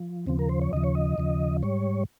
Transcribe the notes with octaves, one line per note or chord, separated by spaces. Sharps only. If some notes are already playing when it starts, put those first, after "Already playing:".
Already playing: F3
D#2 C#3 F3 C4
A#4
C5
C#5
D#2 C#3 F3 D#5
C#5
D#5
D#2 C#3 F3
G#2 G3 C#5